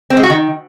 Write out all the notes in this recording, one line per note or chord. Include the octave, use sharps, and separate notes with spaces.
C4
G#3
F#4
D#3